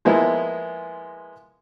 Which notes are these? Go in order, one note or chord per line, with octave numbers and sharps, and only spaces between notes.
F3 G#3 A#3 B3 E4